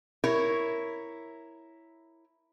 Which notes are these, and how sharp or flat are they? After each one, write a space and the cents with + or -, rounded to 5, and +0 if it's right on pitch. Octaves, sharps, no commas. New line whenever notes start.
E4 +0 A#4 +0 C#5 +0